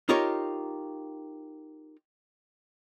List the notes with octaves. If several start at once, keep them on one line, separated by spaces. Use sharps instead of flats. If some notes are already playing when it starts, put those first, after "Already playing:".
D#4 F4 G4 A#4 C#5